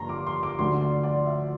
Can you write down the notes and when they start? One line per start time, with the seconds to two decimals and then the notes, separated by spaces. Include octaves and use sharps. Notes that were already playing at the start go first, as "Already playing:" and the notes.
Already playing: G1 G2 A#3 A#5 C6
0.09 D6
0.27 C6
0.43 D6
0.59 D2 D3 A3 D4 C6
0.81 D5
1.03 D5
1.26 E5